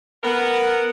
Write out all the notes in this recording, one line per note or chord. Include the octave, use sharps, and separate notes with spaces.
B3 A#4 F#5